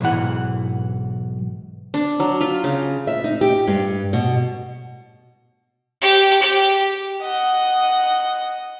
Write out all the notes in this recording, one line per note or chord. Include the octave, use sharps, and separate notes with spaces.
B1 G#2 E3 F#5
D4
F#3
F4
C#3
E5
D#4
G4
G2
B2
G4
G4
D#5 F#5